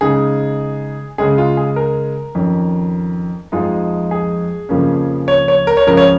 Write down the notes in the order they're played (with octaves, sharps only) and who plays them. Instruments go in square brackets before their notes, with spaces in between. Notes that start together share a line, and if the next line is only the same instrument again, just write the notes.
[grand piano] C#3 G#3 D#4 G#4
C#3 G#3 C#4 G#4
F4
G#4
A#4
F2 D#3 C#4
F2 F3 G#3 D#4 F4
G#4
F2 C#3 F3 A#3 C#4
C#5
C#5
A#4
C#5
C#2 C#3 F3 C#4 A#4
C#5